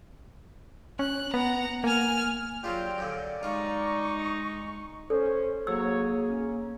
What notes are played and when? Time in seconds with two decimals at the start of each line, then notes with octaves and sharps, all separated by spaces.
0.99 C#4 F#6
1.34 B3 F#5 A#5
1.84 A#3 G#5 F6
2.64 F#3 G3 D4 F4 G4 G#4 G5
2.98 F#2 A#2 D3 D5
3.43 G3 G#3 D#4 F4 C#6
5.10 C#4 A4 C5
5.67 F#3 A#3 G#4 C#5 E6
6.28 C#4